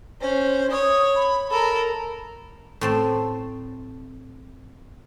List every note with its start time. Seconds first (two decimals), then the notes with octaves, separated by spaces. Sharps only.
0.21 C#4 C5
0.71 C#5 D#6
1.16 B5
1.51 A4 A#4 B5
2.81 A2 C4 A5